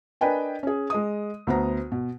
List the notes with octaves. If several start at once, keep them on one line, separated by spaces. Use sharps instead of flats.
D4 A#4 B4 D#5 G5 G#5
C#4 G#4
G#3 D#5 D#6
D2 B3 C5 A#5
B2